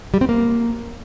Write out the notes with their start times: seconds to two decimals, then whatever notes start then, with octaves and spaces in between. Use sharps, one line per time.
0.14 G3
0.21 C4
0.29 A#3